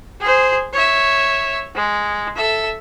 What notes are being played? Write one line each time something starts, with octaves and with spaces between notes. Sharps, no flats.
G#4 C5
C#5 E5
G#3
A4 E5